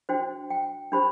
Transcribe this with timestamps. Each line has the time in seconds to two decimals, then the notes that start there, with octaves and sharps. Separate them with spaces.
0.09 D4 F#4 C5 G5
0.50 G5
0.92 D4 G4 C5 B5